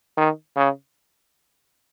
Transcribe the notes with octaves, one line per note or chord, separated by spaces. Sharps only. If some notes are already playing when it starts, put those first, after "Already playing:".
D#3
C#3